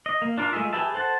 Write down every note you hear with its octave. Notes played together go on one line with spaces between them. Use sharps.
D#5
A#3
D4 F4 A#4
G#3 A3 F4 G#4 E5
G4 G#4 B4 E5 A5
A4 C5 F#5 A5